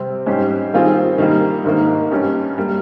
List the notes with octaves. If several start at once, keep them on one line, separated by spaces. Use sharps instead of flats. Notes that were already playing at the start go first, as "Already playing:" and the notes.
Already playing: C3 G3 C4
G#2 G3 C#4 G4 C5
D#3 G3 C4 F4 G#4
D#3 G3 A#3
G#2 D#3 A#3
G2 G3 C#4
G3 A#3